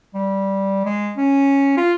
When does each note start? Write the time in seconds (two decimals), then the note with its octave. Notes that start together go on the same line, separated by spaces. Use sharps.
0.15 G3
0.85 G#3
1.17 C#4
1.77 F4